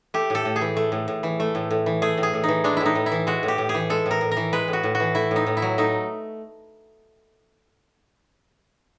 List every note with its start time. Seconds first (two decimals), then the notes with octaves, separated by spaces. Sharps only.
0.14 A3 G4
0.30 A2 A4
0.45 A2
0.56 G#4
0.61 E3
0.77 A3
0.92 A2
1.08 A2
1.23 E3
1.40 A3
1.55 A2
1.71 A2
1.86 E3
2.02 A3 G#4
2.18 A2
2.23 G#4
2.34 A2
2.44 E3 D#4
2.64 G#3 D4
2.77 A2 E4
2.86 D#4
2.95 A2
3.06 E4
3.12 E3
3.27 G#3 F#4
3.43 A2
3.48 G4
3.58 A2
3.69 G#4
3.74 E3
3.90 G#3 A4
4.06 A2 A#4
4.21 A2
4.31 A#4
4.37 E3
4.53 G#3 B4
4.68 A2
4.73 F#4
4.83 A2
4.95 F#4
5.00 E3
5.15 A3 E4
5.31 A2
5.36 D#4
5.47 A2
5.57 E4
5.62 F#3
5.78 A3 D#4